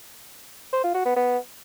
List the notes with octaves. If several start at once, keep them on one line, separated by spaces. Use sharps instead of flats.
C5
F4
F#4
B3
B3